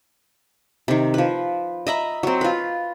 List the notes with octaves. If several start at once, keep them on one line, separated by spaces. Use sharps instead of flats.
C3 D#3
F3 B4
D#5 E5 A#5 B5
F#3 C4
F4 B4